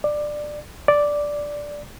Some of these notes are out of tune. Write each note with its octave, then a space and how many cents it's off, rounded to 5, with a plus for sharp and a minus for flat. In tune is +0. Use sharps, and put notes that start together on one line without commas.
D5 +15
D5 -5